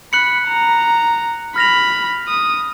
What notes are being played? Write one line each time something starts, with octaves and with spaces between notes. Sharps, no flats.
B5 F#6 C#7 F#7
A#5
B5 F6 A#6 F7
D#6